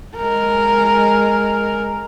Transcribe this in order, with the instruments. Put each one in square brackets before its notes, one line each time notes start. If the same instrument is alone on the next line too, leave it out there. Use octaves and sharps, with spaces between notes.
[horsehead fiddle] G#3 A#4